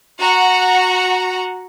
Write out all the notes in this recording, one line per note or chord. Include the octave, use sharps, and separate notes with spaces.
F#4 F#5 A#5